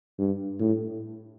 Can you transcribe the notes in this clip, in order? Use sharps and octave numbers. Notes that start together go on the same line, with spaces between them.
G2
A2